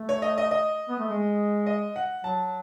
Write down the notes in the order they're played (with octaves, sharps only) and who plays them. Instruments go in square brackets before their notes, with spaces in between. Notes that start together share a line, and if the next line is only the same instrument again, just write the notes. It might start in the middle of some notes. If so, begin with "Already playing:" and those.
Already playing: [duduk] A3
[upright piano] C#5
D#5
D#5
D#5
[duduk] B3
A3
G#3
[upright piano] D#5
F#5
[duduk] F#3 [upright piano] A5